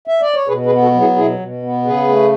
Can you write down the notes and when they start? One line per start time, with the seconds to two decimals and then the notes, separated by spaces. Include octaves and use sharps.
0.07 E5
0.21 D5
0.34 C#5
0.48 B2 G#4 B4
0.66 G#4 B4
0.71 B3
0.82 F#4 A4
0.94 F#3
1.00 E4 G#4
1.16 B2 E4 G#4
1.39 B2
1.62 B3
1.85 C#3 G#4 B4
2.08 A3